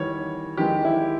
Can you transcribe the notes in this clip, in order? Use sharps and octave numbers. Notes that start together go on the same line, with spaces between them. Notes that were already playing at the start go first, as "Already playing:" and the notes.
Already playing: E2 D#3 G3 C#5
E2 D#3 G#3 G4
E4